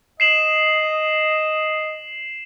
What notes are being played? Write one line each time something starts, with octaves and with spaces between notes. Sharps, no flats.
D#5 C7 E7 F#7